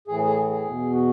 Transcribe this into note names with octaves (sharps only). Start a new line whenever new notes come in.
A2 E3 G#4
G#4
G#4
E2 B2
F#4